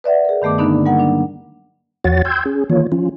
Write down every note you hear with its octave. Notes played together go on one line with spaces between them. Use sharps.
B4 D5 E5 F#5
G#4 A#4
G2 D#3 A3 B3 D6
D3 A#3 B3 D4 D#4
G3 A#3 A#4 F#5
F#3 D4
E2 F3 F#4 C#5 F#5 A6
G5 C6 E6 G6 G#6
C#4 G#4
D#3 E3 A#3 F4 C#5
F3 C#4 F4